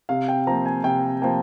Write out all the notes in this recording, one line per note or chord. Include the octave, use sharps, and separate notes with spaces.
C3 F5
G5
F3 A#3 A#5
G#5
C3 G5
F3 A#3 G5